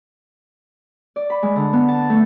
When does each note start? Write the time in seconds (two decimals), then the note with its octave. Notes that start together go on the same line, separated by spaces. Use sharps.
1.16 D5
1.30 B5
1.43 G#3
1.56 D3
1.73 B3
1.88 A5
2.10 A3